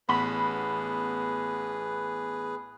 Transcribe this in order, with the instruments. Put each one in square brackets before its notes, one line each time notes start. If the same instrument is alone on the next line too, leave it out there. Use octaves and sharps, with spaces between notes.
[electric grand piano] A1 B3 F#5 [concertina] G#4 B4 [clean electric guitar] B5